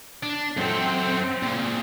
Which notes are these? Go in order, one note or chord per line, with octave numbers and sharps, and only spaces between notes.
D4
F#2 C4 A4
A#2 C#3